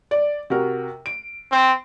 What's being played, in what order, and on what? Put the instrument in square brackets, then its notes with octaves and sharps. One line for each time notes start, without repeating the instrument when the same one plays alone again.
[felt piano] D5
C3 F#4 A#4
D7
[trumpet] C4